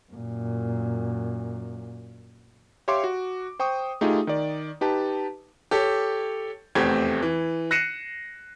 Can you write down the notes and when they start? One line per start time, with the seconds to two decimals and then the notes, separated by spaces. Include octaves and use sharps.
0.12 F#2 A#2
2.88 G4 C#5 E5 F5 C6 D6
3.04 F#4
3.59 C5 G5 C#6 D#6
4.01 A3 D#4 F4 G4 G#4
4.27 D#3 D5
4.81 D#4 G4 B4 A5
5.71 G4 A4 C#5
6.75 F1 E2 A3 C4 G4 G#6
7.22 E3
7.71 F#6 A#6 C7 C#7 D#7 E7